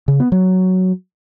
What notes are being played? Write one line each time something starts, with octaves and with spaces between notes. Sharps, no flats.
C#3
B3
F#3